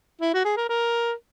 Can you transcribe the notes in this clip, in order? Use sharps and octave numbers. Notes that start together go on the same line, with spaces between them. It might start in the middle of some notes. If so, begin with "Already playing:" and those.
E4
F#4
G#4
A#4
A#4